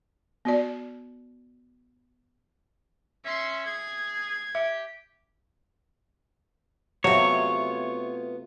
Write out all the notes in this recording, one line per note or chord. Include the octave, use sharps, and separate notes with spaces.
B3 F#4 D5
C#4 E5 C6
G#4 G#6
G4 E5
C3 F#3 A3 B3 F4 C#5